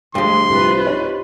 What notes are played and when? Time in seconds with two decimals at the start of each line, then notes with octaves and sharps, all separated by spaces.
0.15 D2 G2 F3 G#3 C6
0.49 C2 F4 B4 C5
0.87 D#4 G4 C#5